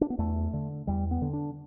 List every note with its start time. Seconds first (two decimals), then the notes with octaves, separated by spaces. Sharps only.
0.01 D4
0.10 B3
0.18 E2 A3
0.53 D3
0.87 E2 G3
1.11 B3
1.22 D3
1.33 D4